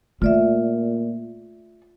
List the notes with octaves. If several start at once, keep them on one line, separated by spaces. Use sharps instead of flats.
A#2 A3 F4 D5 E5